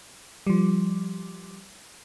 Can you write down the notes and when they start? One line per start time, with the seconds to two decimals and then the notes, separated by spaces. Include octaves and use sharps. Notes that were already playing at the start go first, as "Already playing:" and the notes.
0.47 F3 G3